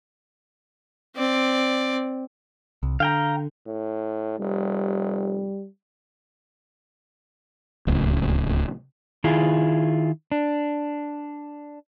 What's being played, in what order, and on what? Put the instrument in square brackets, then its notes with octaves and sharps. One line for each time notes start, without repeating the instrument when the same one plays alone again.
[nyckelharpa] C4 D5
[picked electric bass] C2
[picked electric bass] D3 [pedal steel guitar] F5 G5 A#5
[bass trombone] A2
[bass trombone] F1 [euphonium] G3
[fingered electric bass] D1 C#2
[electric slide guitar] D#3 E4 F4 G#4
D4